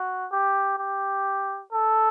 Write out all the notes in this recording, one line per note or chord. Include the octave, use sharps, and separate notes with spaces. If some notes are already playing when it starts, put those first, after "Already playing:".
Already playing: F#4
G4
G4
A4